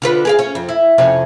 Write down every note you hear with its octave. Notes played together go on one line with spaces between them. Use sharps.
D3 F4 B4
G#4 A#4 F5
C#4
F2
E4
F2 C3 C#4